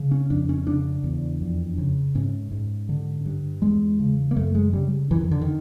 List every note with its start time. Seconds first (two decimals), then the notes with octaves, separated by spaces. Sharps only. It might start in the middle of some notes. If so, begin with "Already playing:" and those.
Already playing: C#3
0.11 C#4
0.30 F2 D4
0.49 C#4
0.67 C#3 D4
1.03 E2
1.41 F2
1.78 C#3
2.15 G#2 C#4
2.51 G#2
2.89 D3
3.25 G2
3.62 E2 G#3
3.99 C#3
4.31 A#3
4.36 F#2 A3
4.55 G#3
4.73 C#3 G3
5.11 F2 E3
5.21 D#3
5.31 D3
5.42 D#3